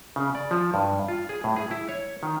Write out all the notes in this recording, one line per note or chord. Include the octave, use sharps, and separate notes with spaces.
C#3
D5
F3
G2
F4
G#4
A2
G#4
E4
C#5
D#3